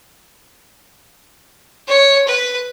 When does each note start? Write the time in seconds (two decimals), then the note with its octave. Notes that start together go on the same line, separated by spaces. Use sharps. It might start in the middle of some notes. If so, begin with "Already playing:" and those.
1.87 C#5
2.27 B4